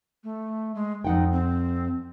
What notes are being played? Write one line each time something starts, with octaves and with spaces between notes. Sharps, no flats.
A3
G#3
F2 D#4 F#5 G5
C4